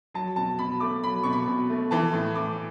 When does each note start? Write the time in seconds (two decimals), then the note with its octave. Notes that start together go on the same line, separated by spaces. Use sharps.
0.14 F#3 A5
0.36 B2 A5
0.59 B2 B5
0.80 A3 D6
1.04 F#3 B5
1.23 B2 C#6
1.33 B5
1.48 B2
1.70 A3
1.91 E3 A5
2.13 A2
2.35 A2 D6